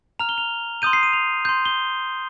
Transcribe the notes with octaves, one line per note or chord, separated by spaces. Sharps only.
A#5 F6 F7
G7
F7
C6 D#6 G6 D#7
C7
D#7
F7
C6 G6
G7